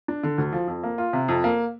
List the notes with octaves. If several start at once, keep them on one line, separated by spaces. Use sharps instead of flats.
D4
D3
D2
F3
F2
A#3
F4
C3
F2
A#3